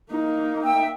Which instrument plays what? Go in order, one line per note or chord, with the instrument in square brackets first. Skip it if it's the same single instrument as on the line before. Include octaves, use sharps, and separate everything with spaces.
[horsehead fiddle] A#3 D#4
[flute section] E5 G5 E6